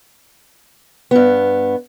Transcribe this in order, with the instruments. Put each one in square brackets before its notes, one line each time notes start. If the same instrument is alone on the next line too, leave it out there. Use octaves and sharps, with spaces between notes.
[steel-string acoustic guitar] G2 B3